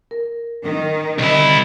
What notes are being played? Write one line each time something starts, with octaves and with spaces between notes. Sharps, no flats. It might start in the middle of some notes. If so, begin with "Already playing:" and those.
A#4
D#3
C2 D3 E4 D#5